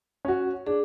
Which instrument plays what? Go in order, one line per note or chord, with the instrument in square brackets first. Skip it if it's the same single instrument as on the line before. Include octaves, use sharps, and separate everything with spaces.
[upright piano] C#4 F#4
[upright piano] D4 [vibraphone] G#4